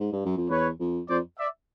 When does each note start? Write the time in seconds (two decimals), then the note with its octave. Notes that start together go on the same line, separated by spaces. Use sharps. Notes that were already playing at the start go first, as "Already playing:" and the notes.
0.00 G#2
0.13 G2
0.26 F#2
0.37 F2
0.50 E2 B4 C#5
0.80 F2
1.09 F2 C5 D5
1.38 D5 E5